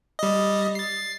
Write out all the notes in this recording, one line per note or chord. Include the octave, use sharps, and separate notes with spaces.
G3 D#5
A6 C7